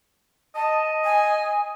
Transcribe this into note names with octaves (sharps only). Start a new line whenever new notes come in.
D#5 A5
G#5